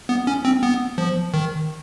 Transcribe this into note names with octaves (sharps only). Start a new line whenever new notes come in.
B3
C#4
C4
B3
F3
D#3